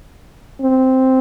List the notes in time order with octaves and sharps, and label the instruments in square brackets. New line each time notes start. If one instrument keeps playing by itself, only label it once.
[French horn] C4